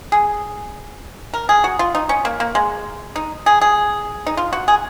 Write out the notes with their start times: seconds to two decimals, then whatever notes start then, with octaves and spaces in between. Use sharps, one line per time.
0.12 G#4
1.34 A#4
1.49 G#4
1.64 F#4
1.79 F4
1.95 D#4
2.09 C#4
2.25 A#3
2.40 A#3
2.55 G#3
3.16 D#4
3.46 G#4
3.61 G#4
4.27 D#4
4.37 F4
4.53 F#4
4.68 G#4